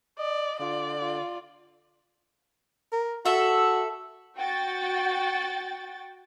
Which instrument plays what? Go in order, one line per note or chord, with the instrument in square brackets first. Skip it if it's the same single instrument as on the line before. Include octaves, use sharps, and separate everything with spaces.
[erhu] D5 [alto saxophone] D#5
[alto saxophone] D3 [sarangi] F4 [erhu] D5
[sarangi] F4
[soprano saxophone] A#4
[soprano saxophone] F#4 [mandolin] A4 E5
[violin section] F#4 G5 A6